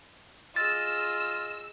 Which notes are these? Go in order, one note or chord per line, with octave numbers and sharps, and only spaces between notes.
F4 G#4 D#5 E6 A6